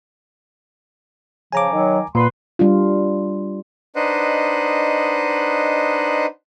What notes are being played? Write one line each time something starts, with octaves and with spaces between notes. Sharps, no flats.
C#3 F3 G#5 A#5 D6
D#3 F#3
A#2 B4 C6
G3 D4 F4
D4 D#4 B4 C5 D#5 F#5